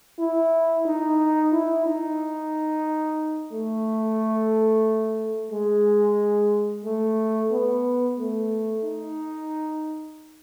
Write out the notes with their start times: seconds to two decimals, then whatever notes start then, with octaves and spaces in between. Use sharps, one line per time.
0.19 E4
0.86 D#4
1.52 E4
1.86 D#4
3.53 A3
5.52 G#3
6.85 A3
7.51 B3
8.19 A3
8.85 D#4